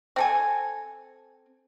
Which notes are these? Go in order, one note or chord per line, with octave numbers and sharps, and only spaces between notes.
C4 A4 G#5